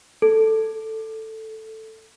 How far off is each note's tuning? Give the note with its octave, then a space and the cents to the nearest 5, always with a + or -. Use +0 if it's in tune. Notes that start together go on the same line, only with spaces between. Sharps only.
A4 +5